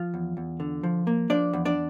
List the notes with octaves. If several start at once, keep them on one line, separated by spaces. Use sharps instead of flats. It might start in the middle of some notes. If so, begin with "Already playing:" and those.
Already playing: F3 F4
E2
E2
D3
F3
A#3
F3 D4 D5
E2
D4 D5